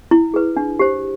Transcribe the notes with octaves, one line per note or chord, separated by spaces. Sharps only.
E4
G#4 B4
D4
G4 C5